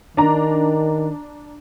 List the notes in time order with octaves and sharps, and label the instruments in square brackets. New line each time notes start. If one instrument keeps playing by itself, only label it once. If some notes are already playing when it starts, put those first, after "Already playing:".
[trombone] D#3 [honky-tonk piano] D4 A#5